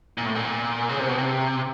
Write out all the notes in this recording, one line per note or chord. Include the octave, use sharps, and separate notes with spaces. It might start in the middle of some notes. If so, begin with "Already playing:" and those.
A#2
A2
A#2
C#3
C3
B2
C3